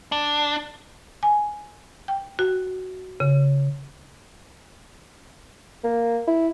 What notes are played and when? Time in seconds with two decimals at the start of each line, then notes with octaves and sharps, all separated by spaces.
0.12 D4
1.23 G#5
2.08 G5
2.39 F#4
3.20 C#3
5.84 A#3
6.27 E4